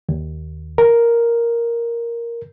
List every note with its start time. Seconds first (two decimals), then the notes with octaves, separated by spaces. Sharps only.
0.09 D#2
0.78 A#4